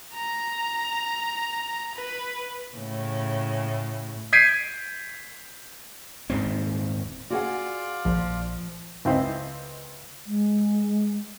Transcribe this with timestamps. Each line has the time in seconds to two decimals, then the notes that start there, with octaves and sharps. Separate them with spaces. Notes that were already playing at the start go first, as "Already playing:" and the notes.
0.13 A#5
1.95 B4
2.75 A2 C#3
4.33 G6 G#6 B6 C7 D7 D#7
6.30 D#1 G#2 C4
7.30 F4 F#4 G#4 D5 F#5
8.05 A#1 F3
9.05 C#2 C4 E4 C5 D#5
10.27 G#3